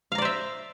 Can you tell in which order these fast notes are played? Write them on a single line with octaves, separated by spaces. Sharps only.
F5 A#5 D5 C5 E5